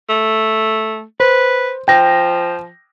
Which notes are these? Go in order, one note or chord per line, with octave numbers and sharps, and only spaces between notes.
A3
B4 C5
F3 G5 A#6